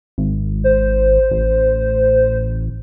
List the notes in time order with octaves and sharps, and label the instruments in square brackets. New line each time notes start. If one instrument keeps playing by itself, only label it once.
[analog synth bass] G#1
[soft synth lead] C5
[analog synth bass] A1